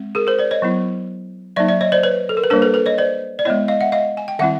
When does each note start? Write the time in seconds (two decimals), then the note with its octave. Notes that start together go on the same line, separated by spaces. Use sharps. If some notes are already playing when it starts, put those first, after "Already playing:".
Already playing: G#3 C4
0.15 G#4 A#4
0.27 A#4 C5
0.38 C5 D5
0.51 C#5 D#5
0.62 F#3 B3 E4
1.56 F#3 A#3 D#4 D5 E5
1.68 D5 E5
1.81 C#5 D#5
1.92 C5 D5
2.03 B4 C#5
2.29 A4
2.37 A#4
2.44 B4
2.50 G3 A#3 D4 A#4 C5
2.62 A4 B4
2.74 A4 B4
2.86 C#5 D#5
2.98 C5 D5
3.39 D5
3.45 G#3 B3 E4 C#5 D#5
3.68 D#5 F5
3.81 E5 F#5
3.92 D#5 F5
4.17 G#5
4.28 G5
4.39 D#3 G3 C4 E4 E5 F#5